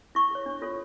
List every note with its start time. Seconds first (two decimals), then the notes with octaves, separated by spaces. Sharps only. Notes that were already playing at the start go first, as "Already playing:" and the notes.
0.15 E4 C#6
0.31 G#4 C#5
0.46 D4
0.62 F4 A4 C#5